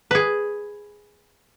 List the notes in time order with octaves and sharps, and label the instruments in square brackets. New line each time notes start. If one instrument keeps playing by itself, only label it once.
[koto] G#4 B4